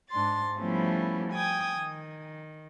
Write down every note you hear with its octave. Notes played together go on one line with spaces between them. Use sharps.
G#2 D4 C6 A6
F3 G3 A3 B3 C#4 E4
G5 G#5 D#6 G#6
D#3